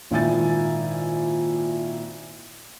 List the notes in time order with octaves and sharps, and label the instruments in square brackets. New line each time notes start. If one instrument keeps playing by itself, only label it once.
[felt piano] G#1 A#2 D#3 E4 G#5 A6